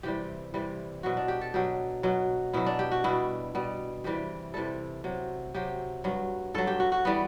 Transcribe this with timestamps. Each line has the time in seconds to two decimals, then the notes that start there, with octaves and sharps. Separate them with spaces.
0.03 C3 E3 G3 G4
0.54 C3 E3 G3
1.03 B2 F#3 F#4
1.17 D4
1.28 G4
1.41 A4
1.54 B2 F#3 G4
2.03 B2 F#3
2.53 B2 F#3 E4
2.66 D4
2.79 G4
2.92 F#4
3.04 B2 G3 E4
3.55 B2 G3
4.04 C3 E3 G3 G4
4.54 C3 E3 G3 A4
5.04 C3 F#3
5.55 C3 F#3 G4
6.04 G2 F#3
6.54 G2 F#3 A4
6.67 G4
6.80 F#4
6.92 F#4
7.05 E3 G3 B3